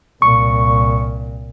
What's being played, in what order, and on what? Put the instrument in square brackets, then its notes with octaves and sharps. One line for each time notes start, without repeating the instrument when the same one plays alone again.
[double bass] C2 A#2 [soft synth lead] C#6